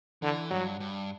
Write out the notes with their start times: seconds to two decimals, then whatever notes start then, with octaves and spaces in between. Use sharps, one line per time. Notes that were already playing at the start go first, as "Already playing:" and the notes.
0.22 D3 E3
0.51 G2 F#3
0.80 G2